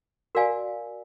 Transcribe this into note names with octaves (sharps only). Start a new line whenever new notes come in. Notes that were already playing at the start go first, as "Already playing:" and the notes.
F#4 A#4 D5 F5 G#5